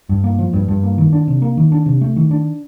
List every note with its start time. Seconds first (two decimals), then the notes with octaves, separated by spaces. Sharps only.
0.09 G2
0.24 A#3
0.39 F3
0.53 G2
0.68 G2
0.83 A#3
0.98 D#3
1.13 D4
1.28 C3
1.42 A#3
1.57 D#3
1.72 D4
1.86 C3
2.01 A3
2.16 D#3
2.31 D4